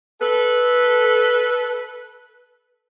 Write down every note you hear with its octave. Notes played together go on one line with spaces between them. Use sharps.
A4 B4